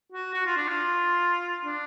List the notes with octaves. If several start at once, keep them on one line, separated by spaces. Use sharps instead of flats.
F#4
F#4
F4
D4
F4
D4